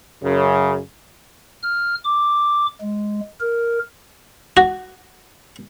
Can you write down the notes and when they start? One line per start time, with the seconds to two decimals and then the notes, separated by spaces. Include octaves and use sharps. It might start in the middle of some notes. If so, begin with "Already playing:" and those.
0.23 F#2 C#3
1.63 F6
2.04 D6
2.81 G#3
3.41 A#4
4.57 F#4